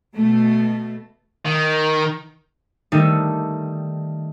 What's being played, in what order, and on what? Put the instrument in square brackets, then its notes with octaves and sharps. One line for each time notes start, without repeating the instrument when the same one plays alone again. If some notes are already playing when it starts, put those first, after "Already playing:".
[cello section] B2 A3
[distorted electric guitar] D#3
[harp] D#3 G3 A3 D#4 A4